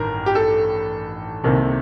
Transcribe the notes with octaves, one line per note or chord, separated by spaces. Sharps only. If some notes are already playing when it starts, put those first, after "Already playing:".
Already playing: A1 G2 D#3 A#4
G4
A4
C2 C3 D#3 A#3